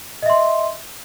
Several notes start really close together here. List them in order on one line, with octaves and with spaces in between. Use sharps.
D#5 E5 C6